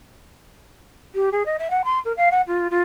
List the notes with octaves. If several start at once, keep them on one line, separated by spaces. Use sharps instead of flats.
G4
G#4
D#5
E5
F#5
C6
A#4
F5
F#5
F4
F4